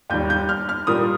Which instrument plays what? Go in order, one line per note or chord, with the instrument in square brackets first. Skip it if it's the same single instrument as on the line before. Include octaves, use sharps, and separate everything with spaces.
[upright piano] D#2 D#3 G3 G6
G6
F6
F6
A#2 G3 A#3 D#6